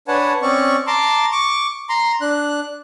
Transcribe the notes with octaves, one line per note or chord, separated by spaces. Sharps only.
D4 B4 C#5 F#5 G#5 A5
C4 C#4 D5 C#6
A5 A#5 C6 D6
C#6 D6
A#5 C6
D4 F#6